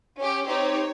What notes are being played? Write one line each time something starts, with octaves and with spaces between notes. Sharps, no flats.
C#4 G4
C4 D#4 G4 C#5